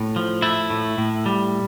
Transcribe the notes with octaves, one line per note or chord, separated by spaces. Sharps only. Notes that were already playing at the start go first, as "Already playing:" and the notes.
Already playing: A2
F3
A3 E4
A2
A2
G3